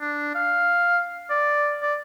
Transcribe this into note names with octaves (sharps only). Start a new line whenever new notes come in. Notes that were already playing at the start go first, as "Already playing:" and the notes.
D4
F5
D5
D5